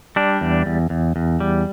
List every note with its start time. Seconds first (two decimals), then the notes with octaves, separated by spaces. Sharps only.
0.16 G3 D4
0.41 E2
0.66 E2
0.90 E2
1.16 E2
1.40 G3